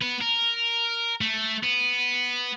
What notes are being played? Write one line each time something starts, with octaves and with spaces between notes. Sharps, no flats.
B3
A#4
A3
B3